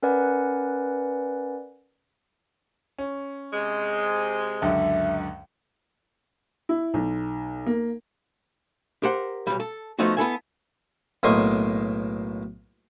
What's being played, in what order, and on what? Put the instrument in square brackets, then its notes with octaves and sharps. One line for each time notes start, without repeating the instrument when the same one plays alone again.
[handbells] C#4 A#4 B4 D5 F#5 G#5
[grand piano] C#4
[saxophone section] C3 G#3
[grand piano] C#2 F#2 D3 [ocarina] E5
[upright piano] E4
B1
A#3
[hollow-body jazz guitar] G4 A#4 C5 F#5
B1 G3
A4
F3 A3 B3 D#4 F#4
B3 E4 A4 G#5
[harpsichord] B1 A2 A#3 D#5 C6 C#6